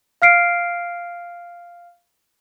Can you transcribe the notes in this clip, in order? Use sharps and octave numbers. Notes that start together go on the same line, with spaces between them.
F5 F6 C7 D7